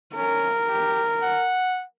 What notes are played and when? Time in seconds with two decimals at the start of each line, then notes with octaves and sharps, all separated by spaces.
0.16 C#4 A#4
0.68 G4
1.23 F#5